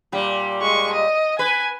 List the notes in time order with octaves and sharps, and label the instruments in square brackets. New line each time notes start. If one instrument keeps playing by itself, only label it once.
[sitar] A#2 G3
[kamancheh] G#3 C#6
D#5
[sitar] B4 [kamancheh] G#5